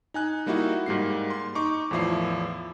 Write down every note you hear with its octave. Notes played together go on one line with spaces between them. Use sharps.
D#4 G#5 F#6
G3 A#3 D#4 E4 F#4
G#2 G3 A#3 C7
C6
D#4 C#6 D6
E2 A2 F3 E4 C7